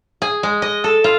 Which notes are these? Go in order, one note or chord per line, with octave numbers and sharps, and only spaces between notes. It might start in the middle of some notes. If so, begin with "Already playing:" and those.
G#4
G#3
D#5
A4
F4